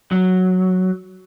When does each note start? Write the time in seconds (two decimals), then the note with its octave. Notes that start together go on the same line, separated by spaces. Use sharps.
0.11 F#3